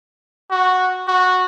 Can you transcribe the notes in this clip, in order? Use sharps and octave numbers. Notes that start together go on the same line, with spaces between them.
F#4
F#4